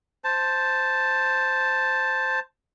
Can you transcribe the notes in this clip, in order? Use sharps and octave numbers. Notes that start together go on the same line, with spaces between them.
C5 A5